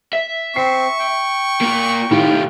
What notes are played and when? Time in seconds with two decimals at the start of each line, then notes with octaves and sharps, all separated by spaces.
0.13 E5
0.56 C4 C#6 C7
0.99 G5
1.61 A#3 F4
2.11 B1 A2 D#3 F4 G4